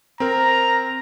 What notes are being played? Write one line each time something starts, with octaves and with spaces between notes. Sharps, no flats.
C4 A#4 A#5